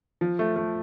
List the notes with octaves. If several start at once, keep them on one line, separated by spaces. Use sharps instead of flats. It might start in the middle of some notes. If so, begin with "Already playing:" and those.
F3
A3
A3